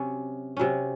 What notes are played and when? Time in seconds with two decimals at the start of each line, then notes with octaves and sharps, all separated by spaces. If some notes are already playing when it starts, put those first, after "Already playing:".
Already playing: C3 F#3 C#4
0.57 C3 F#3 C#4